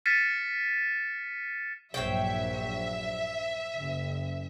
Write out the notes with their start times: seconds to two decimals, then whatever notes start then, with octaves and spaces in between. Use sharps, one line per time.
0.06 F6 A6 B6 C#7 D#7 E7
1.94 A#1 G2 F#3 C5 C#5 E5 G5
3.77 F#1